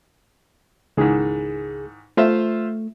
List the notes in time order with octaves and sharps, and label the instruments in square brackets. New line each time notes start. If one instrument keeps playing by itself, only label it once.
[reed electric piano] C#2 G#4 [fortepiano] G#2 D#3 E3
[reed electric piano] A3 [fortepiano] F4 C5 E5